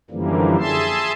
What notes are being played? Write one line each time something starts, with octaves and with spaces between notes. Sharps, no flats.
F#2 D3 E3 F3 G3 A#3
G#4 E5 A5 C6